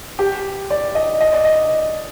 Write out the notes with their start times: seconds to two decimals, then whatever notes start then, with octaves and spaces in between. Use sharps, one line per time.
0.19 G4
0.70 D5
0.95 D#5
1.21 D#5
1.32 D5
1.45 D#5